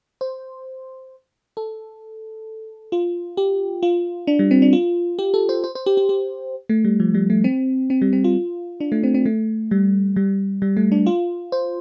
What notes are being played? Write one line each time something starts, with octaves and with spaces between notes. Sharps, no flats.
C5
A4
F4
G4
F4
D4
G3
C4
D4
F4
G4
A4
C5
C5
C5
G4
G4
G4
A3
G3
F3
G3
A3
C4
C4
G3
C4
F4
D4
A3
C4
C4
A3
G3
G3
G3
A3
D4
F4
C5